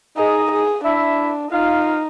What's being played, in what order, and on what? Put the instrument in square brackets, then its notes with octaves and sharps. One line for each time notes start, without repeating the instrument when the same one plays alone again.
[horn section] D#4 D#5 [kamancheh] G#4
[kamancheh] G#4
[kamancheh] D4 [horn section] E4 E5
[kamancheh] D#4 [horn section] F4 F5